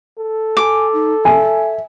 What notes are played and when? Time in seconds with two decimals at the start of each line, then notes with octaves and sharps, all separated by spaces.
0.19 A4
0.57 G#5 D6
0.93 D#4
1.25 E5 G#5